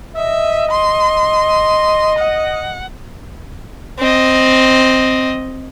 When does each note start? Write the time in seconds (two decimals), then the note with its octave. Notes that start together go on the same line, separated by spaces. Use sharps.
0.16 D#5 E5
0.71 C6
2.19 F#5
3.99 C4 D#5